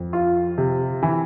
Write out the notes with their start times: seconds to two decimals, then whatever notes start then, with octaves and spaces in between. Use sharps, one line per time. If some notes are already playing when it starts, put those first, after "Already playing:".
Already playing: F2
0.13 F4
0.58 C3
1.03 E3